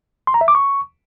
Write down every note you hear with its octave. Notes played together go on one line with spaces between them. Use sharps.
C6
A#5
E5
D6
C#6